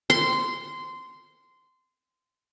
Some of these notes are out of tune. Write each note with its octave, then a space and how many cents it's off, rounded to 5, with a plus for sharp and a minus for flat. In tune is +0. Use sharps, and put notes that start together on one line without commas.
C6 -15